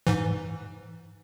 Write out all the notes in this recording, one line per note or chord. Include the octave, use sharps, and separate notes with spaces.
G#2 E3